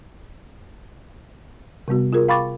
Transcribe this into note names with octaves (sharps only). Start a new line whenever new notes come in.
C3 G3 B3 F#4
F4 G#4 A#4
F5 G5 B5 C#6 D6 A6